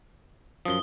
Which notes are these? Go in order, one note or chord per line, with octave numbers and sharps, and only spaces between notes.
F#2 F3 D#6 G7